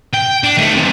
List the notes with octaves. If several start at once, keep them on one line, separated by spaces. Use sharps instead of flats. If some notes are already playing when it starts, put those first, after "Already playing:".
G5
D4
D#3 A3
F#2 C3